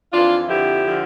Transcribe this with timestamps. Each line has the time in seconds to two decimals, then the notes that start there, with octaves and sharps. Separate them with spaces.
0.13 F2 E3 D4 F4
0.48 F2 D3 F3 E4 G4
0.86 D3 F3